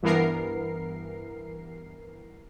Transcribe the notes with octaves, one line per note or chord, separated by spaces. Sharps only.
G2 E3 B3 A#4 C7